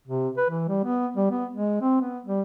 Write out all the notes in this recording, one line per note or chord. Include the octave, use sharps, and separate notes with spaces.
C3
B4
E3
G3
B3
G3
B3
G#3
C4
B3
G3